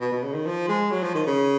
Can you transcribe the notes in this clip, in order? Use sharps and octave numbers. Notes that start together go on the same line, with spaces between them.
B2
B2
C#3
D#3
F3
G#3
F#3
F3
D#3
C#3